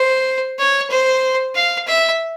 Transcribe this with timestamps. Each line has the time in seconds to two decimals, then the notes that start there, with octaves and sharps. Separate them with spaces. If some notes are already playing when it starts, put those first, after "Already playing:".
Already playing: C5
0.58 C#5
0.90 C5
1.55 F5
1.87 E5